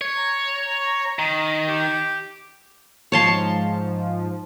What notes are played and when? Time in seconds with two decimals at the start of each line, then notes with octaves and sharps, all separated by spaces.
0.01 C#5
0.17 A#5
1.19 D#3 A#5
1.68 G4
3.12 G#2 F3 C#5 A5 C6